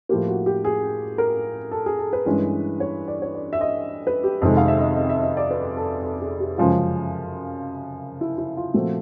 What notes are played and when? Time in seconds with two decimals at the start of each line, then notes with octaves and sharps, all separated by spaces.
0.09 A2 F3 A#3 G4
0.28 F#4
0.46 G4
0.65 G#4
1.18 A#4
1.71 A4
1.86 G#4
1.99 A4
2.13 B4
2.26 G2 E3 G#3 C#4
2.80 C#5
3.08 D5
3.22 C#5
3.35 D5
3.53 E5
3.61 D#5
4.07 B4
4.24 G4
4.42 F2 C3 D#3 G#3 A4
4.57 F5
4.68 E5
4.78 D#5
4.96 D#5
5.10 E5
5.23 D#5
5.37 D5
5.51 B4
5.77 A4
6.04 A4
6.22 G#4
6.40 G4
6.58 F#2 C#3 F3 G#3 C#4 F4
8.21 E4
8.38 E4
8.57 F4
8.74 A#2 F3 A3 C4 F#4